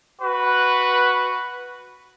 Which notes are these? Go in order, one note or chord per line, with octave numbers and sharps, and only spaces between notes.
F#4 B4